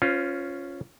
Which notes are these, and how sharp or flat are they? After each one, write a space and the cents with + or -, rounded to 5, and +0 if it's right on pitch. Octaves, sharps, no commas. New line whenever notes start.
C#4 +0 F4 +0 C5 -30